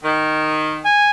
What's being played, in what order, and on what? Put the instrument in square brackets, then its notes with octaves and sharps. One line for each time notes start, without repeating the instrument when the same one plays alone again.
[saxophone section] D#3
[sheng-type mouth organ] G#5